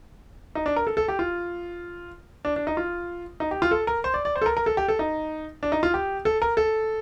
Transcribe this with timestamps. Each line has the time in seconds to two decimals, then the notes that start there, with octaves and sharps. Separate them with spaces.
0.55 D#4
0.66 D4
0.76 A#4
0.87 A4
0.97 A4
1.08 G4
1.19 F4
2.45 D4
2.56 D4
2.67 D#4
2.77 F4
3.40 D#4
3.51 G4
3.62 F4
3.71 A4
3.87 A#4
4.04 C5
4.14 D5
4.25 D5
4.36 C5
4.42 A4
4.46 A#4
4.57 A#4
4.66 A4
4.77 G4
4.88 A4
4.99 D#4
5.63 D4
5.72 D#4
5.83 F4
5.94 G4
6.25 A4
6.42 A#4
6.57 A4